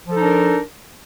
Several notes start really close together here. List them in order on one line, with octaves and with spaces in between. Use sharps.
F3 A4 D#4 D4 A#4